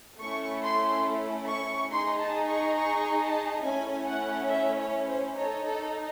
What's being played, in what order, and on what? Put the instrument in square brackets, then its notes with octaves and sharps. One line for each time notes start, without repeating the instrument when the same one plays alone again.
[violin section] A3 C#4 E4 C#6
C6
C#6
D#4 G#4 C6
A5
C#6
C#6
A5
A3 C#4 E4 G#5
F#5
E5
C#5
C5
D#4 A4 C#5
A4